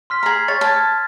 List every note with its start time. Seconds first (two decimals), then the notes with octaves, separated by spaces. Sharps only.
0.10 C6 F6 B6
0.23 G#4 A#5
0.48 C#5 A6
0.61 A5 F6 G#6